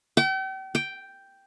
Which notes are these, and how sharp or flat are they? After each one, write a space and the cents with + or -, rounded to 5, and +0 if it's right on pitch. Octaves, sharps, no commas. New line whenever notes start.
G5 -40
G5 +0